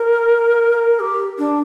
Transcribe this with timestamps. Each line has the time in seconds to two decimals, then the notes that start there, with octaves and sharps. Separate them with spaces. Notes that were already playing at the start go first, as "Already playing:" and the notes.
Already playing: A#4
0.99 G4
1.38 D4